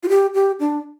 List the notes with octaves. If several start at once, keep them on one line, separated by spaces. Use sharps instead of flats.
F4
G4
G4
D4